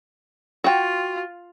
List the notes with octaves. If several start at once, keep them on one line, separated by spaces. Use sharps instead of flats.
F4 F#4 G5